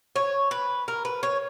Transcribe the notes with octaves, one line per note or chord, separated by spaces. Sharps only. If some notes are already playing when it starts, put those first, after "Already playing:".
C#5
B4
A#4
B4
C#5